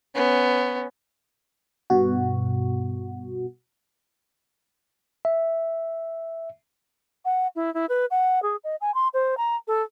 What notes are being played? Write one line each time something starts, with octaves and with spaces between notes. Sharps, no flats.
B3 C#4
G2 B2 F#4
E5
F#5
E4
E4
B4
F#5
G#4
D#5
G#5
C6
C5
A#5
A4